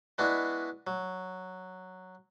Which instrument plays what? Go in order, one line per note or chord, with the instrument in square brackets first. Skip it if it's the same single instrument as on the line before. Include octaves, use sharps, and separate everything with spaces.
[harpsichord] G#3 B3 D4 E4 F#4
F#3